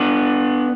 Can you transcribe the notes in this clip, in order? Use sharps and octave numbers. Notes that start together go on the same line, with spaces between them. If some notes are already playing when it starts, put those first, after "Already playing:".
Already playing: B3 D4